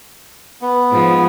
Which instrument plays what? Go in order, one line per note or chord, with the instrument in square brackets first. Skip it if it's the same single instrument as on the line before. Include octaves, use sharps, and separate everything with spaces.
[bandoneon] B3
[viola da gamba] G#2 F3